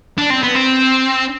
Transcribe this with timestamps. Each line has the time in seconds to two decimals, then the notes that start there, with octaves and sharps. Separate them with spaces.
0.18 D4
0.30 C4
0.43 B3
0.56 C4